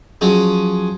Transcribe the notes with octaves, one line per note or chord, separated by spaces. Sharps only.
F3 F#3 C#4 G#4